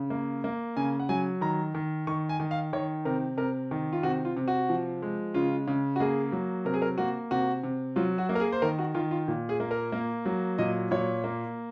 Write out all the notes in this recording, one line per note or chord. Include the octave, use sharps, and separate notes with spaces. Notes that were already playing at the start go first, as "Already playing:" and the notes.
Already playing: C#3
A#3
A#3
C#3 G#5
F#5
F#3 G#5
D#3 A#5
D#3
D#3 C#6
G#5
D#3
F5
D#3 C#5
C3 A#4
C3 A#4
D#3
F4
C3 F#4
F4
C3
F#4
F3
G#3
C#3 F4
C#3
F#4
A#3 G#4
F#3
C3 A#4
G#4
A#4
A#3 F#4
C3 F#4
C3
F#3 F4
F#4
A#3
A#4
G#4
C5
D#3 A#4
F#4
D#3 F4
F4
A#2
G#4
A#3
A#4
A#3
F#3
A#2 D#5
A#2 C#5
A#3